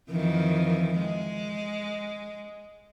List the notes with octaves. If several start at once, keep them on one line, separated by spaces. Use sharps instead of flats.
F2 D#3 E3
G#3